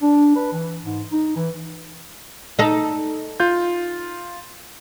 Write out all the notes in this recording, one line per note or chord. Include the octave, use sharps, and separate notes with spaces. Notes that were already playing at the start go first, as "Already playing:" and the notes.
D4
B4
E3
G#2
D#4
E3
D#4 A4
F4 G6